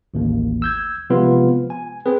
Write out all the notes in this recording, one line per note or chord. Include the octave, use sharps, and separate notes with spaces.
A1 D#2
E6 G6 G#6
C3 F3 G#3 B3 F4 B4
G#5
C4 G#4 B4